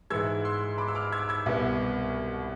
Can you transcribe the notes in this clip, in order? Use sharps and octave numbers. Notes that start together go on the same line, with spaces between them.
G#2 E3 G#3 E6 G#6
C6 E6
B5 D6
E6
D6 F6
E6 G#6
E6 G#6
C2 B2 B3